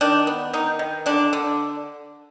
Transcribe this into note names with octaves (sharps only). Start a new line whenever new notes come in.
D#3 D4
B3
D#3 D#4
D#3
D3 D4
D3